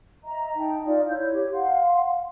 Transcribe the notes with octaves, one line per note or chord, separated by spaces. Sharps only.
D#5 E5 A#5
D#4 G5 A5
D#4 F4 D5
E4 C#5 G6
G4 C#5
F5 F#5 C6